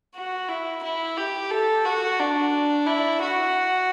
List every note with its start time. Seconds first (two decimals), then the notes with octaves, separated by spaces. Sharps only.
0.16 F#4
0.49 E4
0.83 E4
1.17 G4
1.51 A4
1.85 F#4
2.19 D4
2.87 E4
3.22 F#4